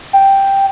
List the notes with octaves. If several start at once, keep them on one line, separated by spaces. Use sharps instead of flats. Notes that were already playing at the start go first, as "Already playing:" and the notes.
G5